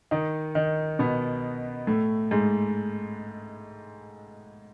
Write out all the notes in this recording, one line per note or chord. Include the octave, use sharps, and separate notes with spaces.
D#3 D#4
D#3 D#4
B2 B3
A2 A3
G#2 G#3